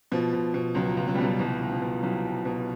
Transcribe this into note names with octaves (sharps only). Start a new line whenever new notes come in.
B2 F3
B2
B2
C#2 F#3
C#2
F#3
G3
B2 F#3
C2 F3
C2
F3
B2
C2 F#3
C2
B2